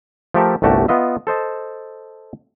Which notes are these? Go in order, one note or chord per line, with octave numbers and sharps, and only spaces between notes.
F3 A3 G4 A4 A#4 E5
G1 C2 A3 F#4 G4 A5
B3 F4 D#5 E5
A4 C5 D#5 A5